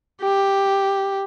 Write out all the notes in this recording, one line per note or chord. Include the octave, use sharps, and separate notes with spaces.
G4